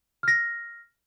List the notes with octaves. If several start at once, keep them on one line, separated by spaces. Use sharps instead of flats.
F6 A#6